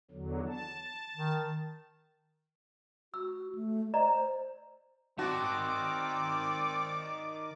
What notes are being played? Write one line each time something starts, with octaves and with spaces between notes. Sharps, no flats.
E2 D3 F#3
A5
D#3
F#4 E6
A3
C5 D5 D#5 A#5
D#3 C4 F#4 D5 A5 D6